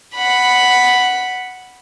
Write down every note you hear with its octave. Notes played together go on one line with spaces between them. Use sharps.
F#5 B5